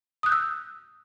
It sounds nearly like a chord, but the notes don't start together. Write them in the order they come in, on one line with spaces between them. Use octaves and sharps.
D#6 F#6 G6 E6